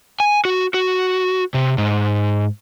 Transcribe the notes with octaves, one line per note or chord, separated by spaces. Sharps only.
G#5
F#4
F#4
C3
G#2